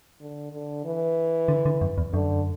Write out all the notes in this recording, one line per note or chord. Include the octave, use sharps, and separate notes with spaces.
D3
D3
E3
D3
D3
F#2
E2
F#2 D3